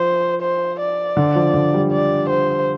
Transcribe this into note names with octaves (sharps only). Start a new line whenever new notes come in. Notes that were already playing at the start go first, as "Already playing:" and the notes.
Already playing: F3 C5
C5
D5
D3
F3
D3
G3
D5
C5